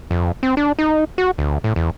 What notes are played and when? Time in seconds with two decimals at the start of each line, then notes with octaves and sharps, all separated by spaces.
0.11 F2
0.43 C4
0.57 D4
0.79 D#4
1.18 F#4
1.38 D2
1.64 A2
1.76 E2